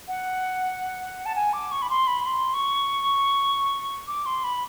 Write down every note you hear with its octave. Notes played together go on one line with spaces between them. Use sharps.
F#5
A5
G#5
D6
C#6
B5
C6
B5
C6
C#6
D6
C6
B5